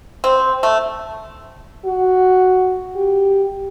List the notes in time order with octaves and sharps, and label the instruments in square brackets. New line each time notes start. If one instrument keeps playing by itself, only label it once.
[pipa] C4
A3
[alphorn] F#4
G4